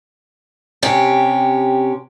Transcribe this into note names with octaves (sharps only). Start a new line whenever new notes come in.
C3 C#4 G4